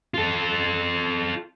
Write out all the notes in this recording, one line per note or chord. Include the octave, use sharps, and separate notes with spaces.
F4 A4